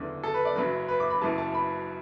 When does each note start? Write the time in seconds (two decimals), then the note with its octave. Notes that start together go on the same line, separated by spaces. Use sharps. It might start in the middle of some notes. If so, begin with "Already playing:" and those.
Already playing: F#1 E2 D3
0.23 A4
0.34 B4
0.45 D5
0.56 F#1 F#2 F#3 B4
0.88 B4
1.00 D6
1.10 B5
1.22 F#1 F#2 E3 A5
1.38 A5
1.54 B5